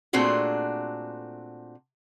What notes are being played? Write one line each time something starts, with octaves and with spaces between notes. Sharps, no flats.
A#2 A3 C4 D4 F#4 G#4